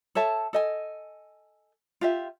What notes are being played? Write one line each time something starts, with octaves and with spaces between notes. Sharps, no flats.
A4 C#5 E5 A5
A4 D#5 G#5
F4 G4 E5